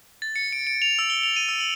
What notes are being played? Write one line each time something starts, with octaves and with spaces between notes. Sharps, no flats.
A6
C#7
D7
D7
F7
E6
G7
F7
D#7
E6
F#7